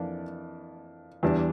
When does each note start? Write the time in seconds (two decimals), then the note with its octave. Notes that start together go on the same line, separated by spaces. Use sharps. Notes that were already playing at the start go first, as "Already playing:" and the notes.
Already playing: F2 E3 A#3 D4 D5
1.23 E2 E3 G3 D4